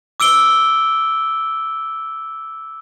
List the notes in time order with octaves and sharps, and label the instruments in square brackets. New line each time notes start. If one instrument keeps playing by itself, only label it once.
[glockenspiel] D6 E6 D7 G7